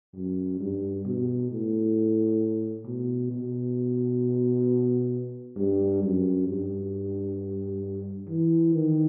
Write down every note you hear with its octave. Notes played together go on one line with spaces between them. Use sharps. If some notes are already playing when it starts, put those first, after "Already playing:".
F#2
G2
B2
A2
B2
B2
G2
F#2
G2
E3
D#3